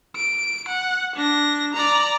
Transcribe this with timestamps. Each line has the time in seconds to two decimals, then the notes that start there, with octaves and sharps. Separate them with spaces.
0.16 D7
0.68 F#5
1.15 D4 A#6
1.74 D5 A#5